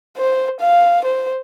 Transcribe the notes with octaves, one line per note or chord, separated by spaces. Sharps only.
C5
F5
C5